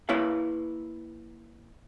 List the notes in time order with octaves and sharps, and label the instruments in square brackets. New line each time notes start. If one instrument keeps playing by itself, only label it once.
[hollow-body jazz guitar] A#3 E4 B4 C#5 F5